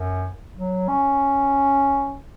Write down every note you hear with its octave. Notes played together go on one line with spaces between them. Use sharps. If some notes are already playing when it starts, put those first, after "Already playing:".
Already playing: F#2
F#3
C#4